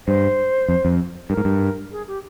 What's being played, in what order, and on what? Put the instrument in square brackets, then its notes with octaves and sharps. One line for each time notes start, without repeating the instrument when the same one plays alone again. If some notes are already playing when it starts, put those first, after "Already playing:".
[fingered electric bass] G2 [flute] C5
[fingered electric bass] F2
F2
[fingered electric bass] G2 [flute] A#4
[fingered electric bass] G#2
G2
[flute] G#4
G4